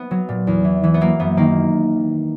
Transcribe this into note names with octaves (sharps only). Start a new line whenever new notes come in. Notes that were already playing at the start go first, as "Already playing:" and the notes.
Already playing: B3
F#3
A#2
E2
E3
E3
B3
F#3 A#3
F#2 B3
D#3 A#3